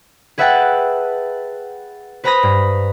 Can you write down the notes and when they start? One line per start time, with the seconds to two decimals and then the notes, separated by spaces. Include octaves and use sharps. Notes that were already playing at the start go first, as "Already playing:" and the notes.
0.38 G#4 B4 E5 F#5 G5 A5
2.24 B4 C5 A#5 B5 D#6 A#6
2.43 G2